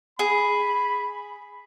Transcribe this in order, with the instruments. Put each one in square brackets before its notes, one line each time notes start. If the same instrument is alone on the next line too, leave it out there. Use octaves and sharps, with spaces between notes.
[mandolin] G#4 [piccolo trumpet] B5